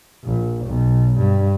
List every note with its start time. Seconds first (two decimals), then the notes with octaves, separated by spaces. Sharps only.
0.25 A#1
0.66 B1
1.18 G2